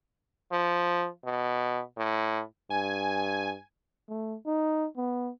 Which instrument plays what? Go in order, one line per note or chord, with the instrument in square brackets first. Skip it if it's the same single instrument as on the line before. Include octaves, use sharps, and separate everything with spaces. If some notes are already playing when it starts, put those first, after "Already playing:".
[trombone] F3
B2
A2
[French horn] G2 [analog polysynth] G#5
[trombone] A3
D#4
B3